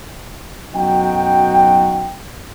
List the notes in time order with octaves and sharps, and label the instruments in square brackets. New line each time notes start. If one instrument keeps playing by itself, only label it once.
[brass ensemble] B1 F#2 D#4 F#4 G5